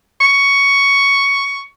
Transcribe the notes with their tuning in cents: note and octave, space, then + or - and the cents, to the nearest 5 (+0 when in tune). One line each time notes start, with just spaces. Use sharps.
C#6 +5